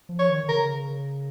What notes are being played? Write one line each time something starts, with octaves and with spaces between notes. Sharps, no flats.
F3
C#5
D#3
D#3
C#3 A#4